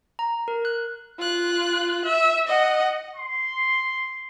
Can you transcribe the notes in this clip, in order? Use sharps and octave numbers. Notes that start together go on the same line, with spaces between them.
A#5
A#4
F#6
F4 F#6
E5
D#5 F#5
C6